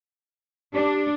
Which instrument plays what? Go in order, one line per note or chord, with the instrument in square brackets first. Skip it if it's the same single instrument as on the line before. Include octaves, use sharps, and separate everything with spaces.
[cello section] D4 [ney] G4